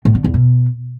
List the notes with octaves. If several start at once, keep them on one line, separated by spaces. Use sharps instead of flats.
A2
D3
E2
B2